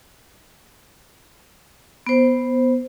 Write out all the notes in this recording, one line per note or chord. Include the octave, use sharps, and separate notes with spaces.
B3 C5